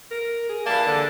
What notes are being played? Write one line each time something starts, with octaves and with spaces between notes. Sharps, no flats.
A#4
G#4
E3 G3 A#3 A5
D3